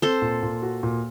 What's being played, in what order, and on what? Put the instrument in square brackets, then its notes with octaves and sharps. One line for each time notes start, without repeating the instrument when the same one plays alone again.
[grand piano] C4 [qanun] A4 C5
[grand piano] A#2
A#2
F#4
A#2